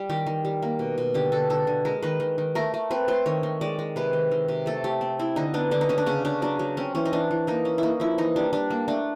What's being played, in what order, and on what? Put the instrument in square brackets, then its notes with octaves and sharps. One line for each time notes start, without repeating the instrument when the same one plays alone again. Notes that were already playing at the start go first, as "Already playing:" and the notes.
Already playing: [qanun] G3
D#3 G4
D#3
G3
A#3
B2
B2
D3 G4
D3 A4
D3 A4
D3
G#3 A#4
D#3 B4
D#3
D#3
A3 A#4
A3
C4 B4
A3 C5
D#3 C#5
D#3
G#3 D5
G#3
C3 B4
D#3
D#3
C3
A3 A4
A3 G4
C4
C4 E4
D3 D#4
B3 D4
D3 D4
D#4
D3 C#4
D4
C#3 C#4
C#3 D4
F#3 D4
F#3
C4 C#4
E3 C#4
D#4
E3 D4
E3
A#3 D#4
C#4
A#3 D#4 E4
F3 E4
E3 D#4
G3 D4
G3 D4
A#3
A3 D4